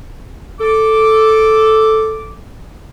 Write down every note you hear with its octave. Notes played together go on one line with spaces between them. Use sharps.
A4 D6